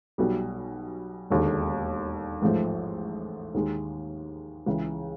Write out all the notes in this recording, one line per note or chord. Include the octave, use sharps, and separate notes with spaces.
B1 B2 G3
E1 D#2 D3
A1 G#2 F3 A3
D#2 D#3 G#3
C#2 C#3 E3